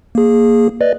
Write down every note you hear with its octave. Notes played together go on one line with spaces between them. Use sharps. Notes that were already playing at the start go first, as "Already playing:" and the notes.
A#3 G#4
B4 D5 D#5